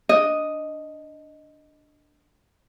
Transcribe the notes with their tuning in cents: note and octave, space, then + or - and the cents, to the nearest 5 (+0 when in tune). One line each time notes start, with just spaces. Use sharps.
D4 +0 D#5 +0